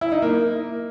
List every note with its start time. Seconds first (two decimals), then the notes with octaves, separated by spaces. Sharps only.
0.01 E4
0.12 D#4
0.22 A#3